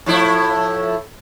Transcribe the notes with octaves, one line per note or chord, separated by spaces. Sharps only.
A2 F3 E4